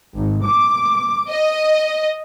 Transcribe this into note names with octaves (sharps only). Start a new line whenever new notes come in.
G#1
D6
D#5